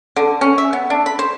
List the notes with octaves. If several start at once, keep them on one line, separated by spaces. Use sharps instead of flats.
D3
C#4
E5
B3
D4
B5
C5